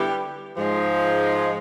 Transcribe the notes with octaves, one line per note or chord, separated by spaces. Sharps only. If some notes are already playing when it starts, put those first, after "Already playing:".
Already playing: D3 G3 B3 E4 G4
G#2 F3 G#3